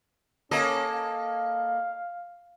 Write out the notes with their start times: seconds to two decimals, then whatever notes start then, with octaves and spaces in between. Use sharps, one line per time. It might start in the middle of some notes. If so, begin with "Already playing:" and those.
0.51 A#3 C#4 A4 D#5
0.93 F5